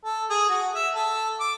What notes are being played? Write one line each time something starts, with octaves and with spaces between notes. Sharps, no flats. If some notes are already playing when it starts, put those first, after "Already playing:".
A4
G#4
F#4
E5
A4
D6